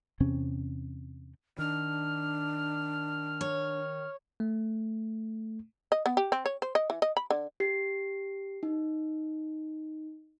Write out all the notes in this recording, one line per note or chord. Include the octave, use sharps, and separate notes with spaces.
E2 C3 C4 C#4
D#3 D4 F6
C#5
A3
D#5
B3
G4
C4
C#5
C5
D#5
E3
D#5
B5
D3
G4 C7
D#4